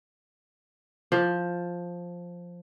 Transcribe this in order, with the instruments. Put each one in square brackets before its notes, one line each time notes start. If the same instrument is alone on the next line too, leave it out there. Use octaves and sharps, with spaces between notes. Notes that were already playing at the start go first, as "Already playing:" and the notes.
[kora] F3